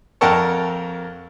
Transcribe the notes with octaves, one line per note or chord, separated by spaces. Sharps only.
F2 A#4 F#5 G5 A5 C#6